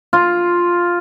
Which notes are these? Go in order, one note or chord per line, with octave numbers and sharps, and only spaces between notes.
F4